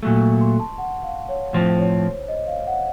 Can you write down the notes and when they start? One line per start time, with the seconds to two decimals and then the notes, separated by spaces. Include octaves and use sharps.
0.03 A#2 F#3 A3
0.21 C#6
0.41 C6
0.60 A5
0.78 F#5
1.03 F5
1.29 C#5
1.53 A2 F3 C4 C5
1.79 C#5
2.28 D#5
2.47 F5
2.67 F#5